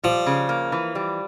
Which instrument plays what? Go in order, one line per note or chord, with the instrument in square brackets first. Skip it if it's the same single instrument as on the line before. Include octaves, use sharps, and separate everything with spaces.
[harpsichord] F3 [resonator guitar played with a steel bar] G3
[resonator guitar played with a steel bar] C#3
A#3
E3
G3